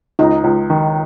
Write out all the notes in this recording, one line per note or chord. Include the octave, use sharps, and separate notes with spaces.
C#2 D#4
C#2
D#3